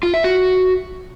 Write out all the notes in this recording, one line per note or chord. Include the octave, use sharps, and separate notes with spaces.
F4
E5
F#4